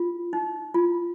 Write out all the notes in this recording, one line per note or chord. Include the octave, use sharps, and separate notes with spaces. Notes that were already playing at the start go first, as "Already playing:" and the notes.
Already playing: F4
D#4
F4